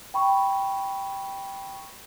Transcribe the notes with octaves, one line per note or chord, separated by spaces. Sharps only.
G5 B5 C#6